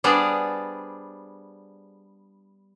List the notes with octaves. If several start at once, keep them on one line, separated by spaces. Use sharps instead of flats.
G3 B3 D4 G#4 C5 D5